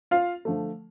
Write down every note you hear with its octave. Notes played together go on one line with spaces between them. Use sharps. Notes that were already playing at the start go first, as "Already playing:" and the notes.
F4 F5
D3 F3 A3